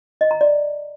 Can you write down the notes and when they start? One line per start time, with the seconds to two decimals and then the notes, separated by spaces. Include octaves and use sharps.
0.21 D#5
0.31 A#5
0.41 D5